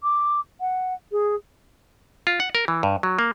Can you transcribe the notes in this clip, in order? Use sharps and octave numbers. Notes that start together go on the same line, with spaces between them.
D6
F#5
G#4
F4
F#5
A#4
E3
G2
F#3
A#3